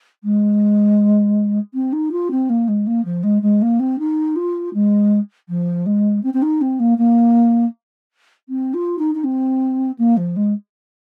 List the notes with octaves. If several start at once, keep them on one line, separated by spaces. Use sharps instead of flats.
G#3
C4
D#4
F4
C4
A#3
G#3
A#3
F3
G#3
G#3
A#3
C4
D#4
F4
G#3
F3
G#3
C4
C4
D#4
C4
A#3
A#3
C4
F4
D#4
D#4
C4
A#3
F3
G#3